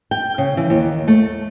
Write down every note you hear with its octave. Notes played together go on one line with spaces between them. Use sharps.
G5
C#3
E3
D#2
A3